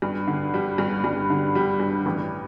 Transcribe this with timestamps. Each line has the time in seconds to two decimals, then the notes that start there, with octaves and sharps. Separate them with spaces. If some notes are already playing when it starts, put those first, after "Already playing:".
0.02 G2
0.27 D3
0.54 G3
0.78 G2
1.04 G2
1.30 D3
1.55 G3
1.80 G2
2.06 A1